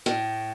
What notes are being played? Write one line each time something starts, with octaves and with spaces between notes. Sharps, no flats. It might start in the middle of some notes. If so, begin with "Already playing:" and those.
A2